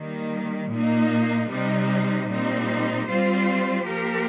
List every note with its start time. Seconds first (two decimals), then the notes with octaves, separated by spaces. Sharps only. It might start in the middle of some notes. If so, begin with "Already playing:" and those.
Already playing: D#3 G3 A#3
0.71 A#2 A#3 D#4
1.50 C3 G3 D#4
2.29 A#2 G3 C4 D#4
3.08 G3 C4 F4 C5
3.87 F3 A#3 G4 A#4